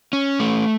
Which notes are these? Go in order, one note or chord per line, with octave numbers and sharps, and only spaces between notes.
C#4
A3